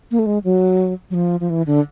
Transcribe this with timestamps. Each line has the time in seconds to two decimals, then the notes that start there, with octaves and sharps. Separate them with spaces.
0.11 A#3
0.19 A3
0.26 G#3
0.44 F#3
1.10 F#3
1.14 F3
1.40 F3
1.50 E3
1.67 D3